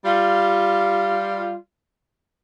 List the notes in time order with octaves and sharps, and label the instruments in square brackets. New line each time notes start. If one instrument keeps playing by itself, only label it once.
[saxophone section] G3 F4